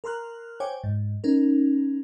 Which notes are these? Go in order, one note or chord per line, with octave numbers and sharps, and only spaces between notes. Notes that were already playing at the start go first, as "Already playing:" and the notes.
A#4 A#5 C6 F6 F#6
C5 C#5 G5 G#5 C#6 D6
G#2
C#4 D#4 A#4